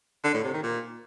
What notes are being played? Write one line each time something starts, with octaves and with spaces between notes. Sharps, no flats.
D3
A2
C3
D#3
A#2